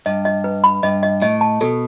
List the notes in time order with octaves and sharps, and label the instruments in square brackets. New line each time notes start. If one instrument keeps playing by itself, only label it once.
[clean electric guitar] G2 [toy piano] D#5
[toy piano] D#5
B4
B5
[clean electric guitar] G2 [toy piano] D#5
[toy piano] D#5
[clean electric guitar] A2 [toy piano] D#5
[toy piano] A5
[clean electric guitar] B2 [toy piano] A4